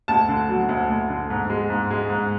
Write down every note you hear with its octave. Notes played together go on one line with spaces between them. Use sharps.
D2 A5
D3
F#3
D2
D2
D3
G#2
G#3
G#2
G#3
G#2